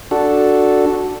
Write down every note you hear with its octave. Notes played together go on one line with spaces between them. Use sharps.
D4 F#4 A4